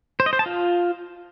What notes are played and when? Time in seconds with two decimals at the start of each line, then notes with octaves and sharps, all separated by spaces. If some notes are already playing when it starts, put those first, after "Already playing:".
0.20 C5
0.26 D#5
0.33 C5
0.39 A5
0.46 F4